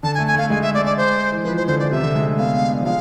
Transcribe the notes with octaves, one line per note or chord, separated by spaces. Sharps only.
D3 A5
G#5
A3
G#5
A3 F5
G#3 G#5
E5
D5
D5
C5
E3
F3 B4
C5
D3 C5
D3 D5
C3 E5
D3
G#3
A3
B3 F5
D4
F3
G#3 F5